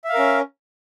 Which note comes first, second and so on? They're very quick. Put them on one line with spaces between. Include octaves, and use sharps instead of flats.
E5 F5 A#4 C#4